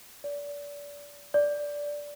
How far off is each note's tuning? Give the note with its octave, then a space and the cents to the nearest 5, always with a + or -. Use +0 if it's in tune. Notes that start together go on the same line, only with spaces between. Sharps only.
D5 -30
D5 -10